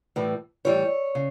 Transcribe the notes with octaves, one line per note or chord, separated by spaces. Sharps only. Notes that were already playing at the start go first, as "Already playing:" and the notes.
A2 E3 G3
A2 E3 G3 C#5
C#3